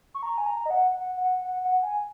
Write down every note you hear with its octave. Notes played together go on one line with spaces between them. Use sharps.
C#6
A#5
G#5
A#5
D#5
F#5
F#5
F#5
F#5
F#5
G#5